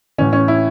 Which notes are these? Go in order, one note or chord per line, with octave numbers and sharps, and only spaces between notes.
A1 A2 E3 C#4
C#4
E4